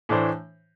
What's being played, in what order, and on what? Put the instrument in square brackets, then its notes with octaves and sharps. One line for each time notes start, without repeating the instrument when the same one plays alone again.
[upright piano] A2 E3 A3 D4 C5